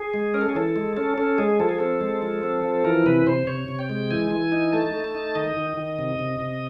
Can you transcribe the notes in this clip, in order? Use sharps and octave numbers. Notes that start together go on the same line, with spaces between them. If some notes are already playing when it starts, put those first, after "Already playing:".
Already playing: G#4
G#3
C#4 A#4
A4
G#4
E3 A4
G#3
C#4 A4
C#4 A4
G#3 G#4
F3 A4
G#4
C4 A4
G#3
F3
C4
F3
E3 A#4
C3 B4
C3 C5
C3 C#5
C3
G5
G#3
E3 G#5
E3
D#4
A3 A5
A3
A5
D#4
D#3 D#5
D#3
D#3
C3
C3
C3